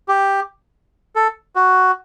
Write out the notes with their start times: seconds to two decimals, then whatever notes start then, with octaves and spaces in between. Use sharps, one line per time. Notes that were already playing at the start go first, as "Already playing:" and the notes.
0.08 G4
1.16 A4
1.56 F#4